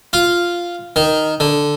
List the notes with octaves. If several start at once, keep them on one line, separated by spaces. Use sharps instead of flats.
F4
D#3
D3